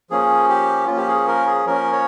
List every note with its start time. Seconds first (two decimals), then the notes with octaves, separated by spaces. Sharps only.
0.10 F3 A#3 C#4 G#4
0.49 G4
0.87 F3 A#3 C#4 F4
0.97 G4
1.08 G#4
1.27 A#4
1.47 G#4
1.67 F3 A#3 C#4 A#4
1.93 C#5